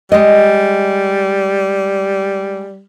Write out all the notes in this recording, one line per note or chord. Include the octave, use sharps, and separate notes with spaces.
G3 G#3 D#5